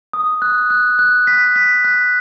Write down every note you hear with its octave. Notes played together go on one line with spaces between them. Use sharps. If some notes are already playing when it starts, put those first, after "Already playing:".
D#6
F#6
F#6
F#6
B6
B6
F#6